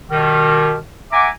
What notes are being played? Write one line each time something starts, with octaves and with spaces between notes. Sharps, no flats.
B2 D#3 G3
E5 F#5 G#5 A#5 D6